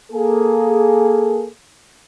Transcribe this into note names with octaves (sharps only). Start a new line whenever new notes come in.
A#3 G#4 A4